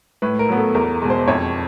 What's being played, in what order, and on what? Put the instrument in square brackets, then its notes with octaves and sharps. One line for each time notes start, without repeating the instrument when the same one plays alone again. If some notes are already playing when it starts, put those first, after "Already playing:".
[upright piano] A2 [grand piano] B4
[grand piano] A#4
[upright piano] F#3 B3
[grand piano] A4
[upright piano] E2 [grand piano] A#4
[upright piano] B2 G#3
[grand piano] C5
[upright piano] F2 [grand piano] C#5